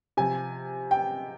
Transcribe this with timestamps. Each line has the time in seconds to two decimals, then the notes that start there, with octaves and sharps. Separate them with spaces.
0.17 C3 F3 G#5
0.91 G5